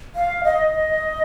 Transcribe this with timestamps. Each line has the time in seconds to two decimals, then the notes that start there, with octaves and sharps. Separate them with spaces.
0.16 F5
0.44 D#5